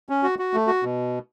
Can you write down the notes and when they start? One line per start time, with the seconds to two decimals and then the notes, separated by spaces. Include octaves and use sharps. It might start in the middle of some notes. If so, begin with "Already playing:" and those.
0.09 C#4
0.23 F#4
0.39 F#4
0.54 A3
0.67 F#4
0.83 B2